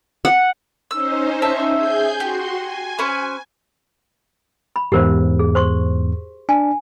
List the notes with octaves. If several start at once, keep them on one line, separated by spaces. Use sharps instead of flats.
F#5
C#4 D#4 C5 E6
E5 A5
G#4 G#5 G6
F#4 G4 C6
G#5
C#4 B4 C5
B5
E2 G#2 G4 A#4 C5
G#4
C5 C6 C#6
D4 G#5